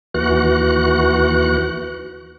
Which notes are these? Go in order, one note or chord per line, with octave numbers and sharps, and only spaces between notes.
D#2 E3 F#4 F#6